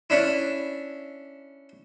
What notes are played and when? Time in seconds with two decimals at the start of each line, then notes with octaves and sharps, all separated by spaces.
0.10 C#4 D4 E4